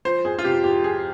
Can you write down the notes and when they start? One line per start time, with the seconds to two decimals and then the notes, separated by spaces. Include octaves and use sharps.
0.05 F3 C5
0.25 F2 G#4
0.39 F4
0.44 C3 G4
0.64 F2 G4
0.83 F3 G#4